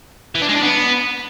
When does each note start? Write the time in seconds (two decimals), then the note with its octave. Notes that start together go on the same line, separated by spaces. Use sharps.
0.35 E3
0.42 D4
0.49 G#3
0.56 D4
0.62 B3